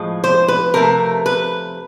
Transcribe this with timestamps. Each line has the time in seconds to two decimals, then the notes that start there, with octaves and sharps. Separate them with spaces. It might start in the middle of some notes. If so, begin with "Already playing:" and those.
Already playing: A2 F3 G#3
0.24 C5
0.48 B4
0.74 C3 F3 A3 A#4
1.26 B4